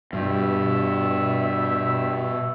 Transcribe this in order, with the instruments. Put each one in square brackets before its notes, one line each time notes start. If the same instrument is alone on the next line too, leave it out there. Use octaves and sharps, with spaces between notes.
[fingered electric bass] G2 [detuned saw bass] B2 [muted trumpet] E5